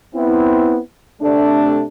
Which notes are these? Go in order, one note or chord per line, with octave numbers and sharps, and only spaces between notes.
B3 C4 E4
C3 A3 D4